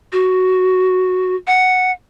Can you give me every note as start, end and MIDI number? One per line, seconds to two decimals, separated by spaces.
0.13 1.36 66
1.47 1.91 78